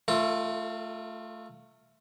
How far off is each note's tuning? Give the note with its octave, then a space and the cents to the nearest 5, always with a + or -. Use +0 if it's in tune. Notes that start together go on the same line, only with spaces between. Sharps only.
A3 +0 F4 +0 A4 +45